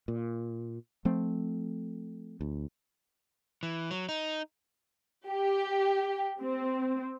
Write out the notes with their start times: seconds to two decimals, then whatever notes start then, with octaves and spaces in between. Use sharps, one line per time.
0.08 A#2
1.05 F3 A3 C4
2.41 D2
3.63 E3
3.91 F#3
4.09 D#4
5.29 G4
6.41 C4